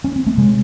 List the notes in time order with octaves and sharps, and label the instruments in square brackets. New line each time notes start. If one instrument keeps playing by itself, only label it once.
[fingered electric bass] C#4
C4
A3
C3 G#3